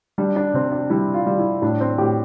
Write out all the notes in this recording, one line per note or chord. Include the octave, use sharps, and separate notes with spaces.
G3 D4
D4
C3 C4
D4
G3 E4
F4
G3
E4
A2 D4
C4
A2 G4